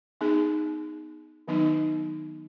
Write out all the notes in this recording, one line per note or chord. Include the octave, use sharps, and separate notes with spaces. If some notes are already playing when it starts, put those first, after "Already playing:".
B3 D#4 G#4
D#3 F#3 B3 D#4